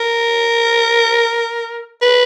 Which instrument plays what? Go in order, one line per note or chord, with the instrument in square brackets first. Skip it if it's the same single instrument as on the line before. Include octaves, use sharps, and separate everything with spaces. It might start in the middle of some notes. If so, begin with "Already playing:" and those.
Already playing: [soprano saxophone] A#4
B4